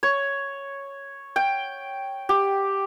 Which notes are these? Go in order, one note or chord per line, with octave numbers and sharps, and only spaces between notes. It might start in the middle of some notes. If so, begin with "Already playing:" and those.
C#5
G5
G4